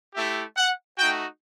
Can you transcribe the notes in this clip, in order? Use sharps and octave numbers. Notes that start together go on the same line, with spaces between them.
A3 E4 G4 E5
F#5
A3 D#4 F#4 G5